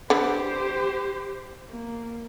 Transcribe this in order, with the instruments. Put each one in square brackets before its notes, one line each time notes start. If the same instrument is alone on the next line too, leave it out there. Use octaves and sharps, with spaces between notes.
[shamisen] D3 B3 [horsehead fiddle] G4 C5
[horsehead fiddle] A#3